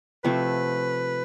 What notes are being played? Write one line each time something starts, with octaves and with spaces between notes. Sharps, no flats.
C3 F3 A3 B4